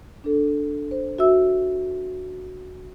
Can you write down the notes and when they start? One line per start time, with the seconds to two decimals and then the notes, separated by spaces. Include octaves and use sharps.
0.24 D4 A4
0.91 C5
1.18 F#4 E5 E6